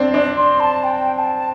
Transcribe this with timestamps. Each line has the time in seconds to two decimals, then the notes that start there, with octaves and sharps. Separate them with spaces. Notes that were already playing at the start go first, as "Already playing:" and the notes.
Already playing: C4 D4
0.14 D4
0.37 C6
0.60 A5
0.84 G5
1.19 A5